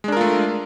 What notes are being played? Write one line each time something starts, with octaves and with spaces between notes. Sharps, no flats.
G#3 A3 D4 F4 A#4